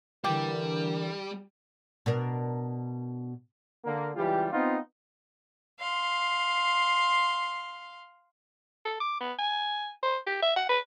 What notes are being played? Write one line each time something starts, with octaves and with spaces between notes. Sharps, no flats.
D3 E3 G3 G4 A#4 E7
B2 D4 A#4
D3 A#3
C#2 E3 G3 F4 G4
B3 C4 D#4 F4
F5 C6
A4
D6
B3
G#5
C5
G4
E5
F#5
B4